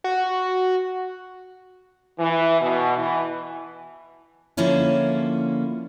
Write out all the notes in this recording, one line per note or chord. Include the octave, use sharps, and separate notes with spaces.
F#4
E3
B2
E3
D3 F3 A#3 C#4 E4